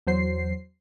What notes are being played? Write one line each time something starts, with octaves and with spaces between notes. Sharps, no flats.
E2 F#3 C5 C7